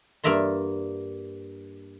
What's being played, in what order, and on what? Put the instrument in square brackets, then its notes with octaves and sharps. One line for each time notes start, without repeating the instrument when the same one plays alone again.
[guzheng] G2 A#3 D5 E5 A#5 C6